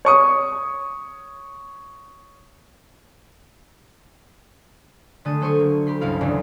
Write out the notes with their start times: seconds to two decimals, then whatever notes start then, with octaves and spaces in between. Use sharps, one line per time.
0.05 C#5 C#6 D#6
5.25 D3 G#3 A3 D#6 A6
5.41 F#3 A4 C5 C6 C#6 D#7
5.59 A#3
5.87 G4 B5 C6
6.01 G1 C#2 G3 E4 F5
6.21 F#1 E2 F#3 D4 D#4